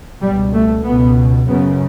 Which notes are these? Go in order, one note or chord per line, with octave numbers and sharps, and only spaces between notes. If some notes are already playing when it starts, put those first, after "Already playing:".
C#2 B2 G3
A3
C#2 B2 B3
F#2 C#3 B3